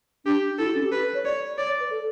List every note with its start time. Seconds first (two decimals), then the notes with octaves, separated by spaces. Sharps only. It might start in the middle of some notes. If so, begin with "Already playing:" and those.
0.25 D4 G4
0.59 E4 A4
0.67 F#4
0.75 C#4
0.84 G4
0.92 B4
1.03 B4
1.14 C#5
1.25 C#5 D5
1.57 C#5 D5
1.68 C#5
1.80 B4
1.90 A4